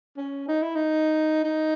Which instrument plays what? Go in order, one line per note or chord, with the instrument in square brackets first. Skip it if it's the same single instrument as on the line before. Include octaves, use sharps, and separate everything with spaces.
[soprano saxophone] C#4
D#4
E4
D#4
D#4